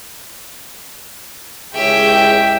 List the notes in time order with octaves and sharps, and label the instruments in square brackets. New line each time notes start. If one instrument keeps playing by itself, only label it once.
[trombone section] C#2 E4 G#4 [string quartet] G4 C#5 [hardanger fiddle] E5 G5